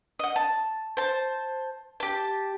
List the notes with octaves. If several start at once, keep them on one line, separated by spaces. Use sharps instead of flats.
D#5 F#5
A5
C5 A5
G4 A5